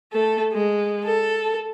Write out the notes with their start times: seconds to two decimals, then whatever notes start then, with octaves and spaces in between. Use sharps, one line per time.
0.12 A3 A4
0.52 G#3
1.05 A4